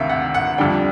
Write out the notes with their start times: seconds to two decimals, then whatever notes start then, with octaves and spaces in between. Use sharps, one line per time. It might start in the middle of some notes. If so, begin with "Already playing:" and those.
Already playing: D2 C3 D#3 E5 F5
0.09 F#5
0.34 F#5
0.58 F2 D3 G3 G5